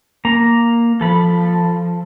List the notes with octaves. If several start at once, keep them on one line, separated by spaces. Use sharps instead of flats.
A#3 A#5
F3 A4 B5